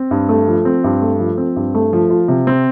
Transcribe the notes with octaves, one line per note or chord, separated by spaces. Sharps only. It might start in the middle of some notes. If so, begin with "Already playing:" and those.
Already playing: C4
G2
A3
F3
C4
G2
A3
F3
C4
G2
A3
F3
F4
C3
C4